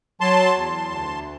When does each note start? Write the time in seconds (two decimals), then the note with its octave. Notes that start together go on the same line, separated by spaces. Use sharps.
0.21 F#3 A5 C6
0.56 E2
0.91 D2